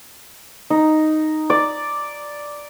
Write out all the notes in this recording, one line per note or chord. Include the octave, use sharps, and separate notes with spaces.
D#4
D5